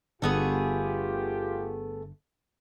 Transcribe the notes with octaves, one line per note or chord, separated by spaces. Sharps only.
G1 G2 D3 A3 B3 F4 G4 G#4